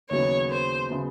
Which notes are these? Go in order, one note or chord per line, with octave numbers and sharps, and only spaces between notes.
D#2 C#3 F#3 B3 C#5
C5
C#3 F#3 B3